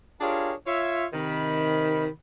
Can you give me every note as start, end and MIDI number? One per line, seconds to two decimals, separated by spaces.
0.20 0.53 62
0.20 0.53 65
0.20 0.53 67
0.20 0.53 68
0.20 0.53 70
0.20 0.53 73
0.66 1.05 65
0.66 1.05 73
0.66 1.05 76
1.13 2.08 48
1.13 2.08 51
1.13 2.08 83